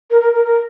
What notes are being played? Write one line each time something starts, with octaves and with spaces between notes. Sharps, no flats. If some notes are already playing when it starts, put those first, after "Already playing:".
A#4
A#4
A#4
A#4